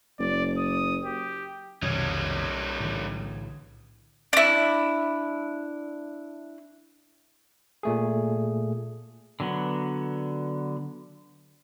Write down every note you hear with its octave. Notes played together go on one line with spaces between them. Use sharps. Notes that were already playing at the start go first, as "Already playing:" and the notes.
F#1 D5
D#6
G4
B1 F2 C3 D#3 G3 C#4 D#6 G#6
A2 D3 E3
D4 E4
A#2 A3 G#4
D3 F#3 B3